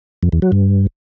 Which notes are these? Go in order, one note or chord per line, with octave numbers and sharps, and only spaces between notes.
F2
E2
F#3
G2